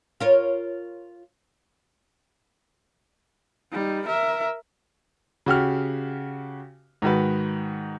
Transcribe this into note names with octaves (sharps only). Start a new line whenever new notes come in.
F4 A#4 C#5
G3 D#4
A#4 E5
C#3 F#4 G4 F6
G#2 D#3 F#4 B4